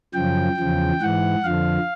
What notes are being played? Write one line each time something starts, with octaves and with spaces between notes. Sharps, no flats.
F#2 C#3 F3 G5
E2 C#3 F3
G#2 E3 F#5
F2 D3 F3 F5